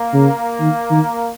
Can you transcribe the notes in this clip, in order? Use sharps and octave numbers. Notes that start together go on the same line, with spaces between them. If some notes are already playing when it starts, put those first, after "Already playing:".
Already playing: A#3
C#3
D#3
D#3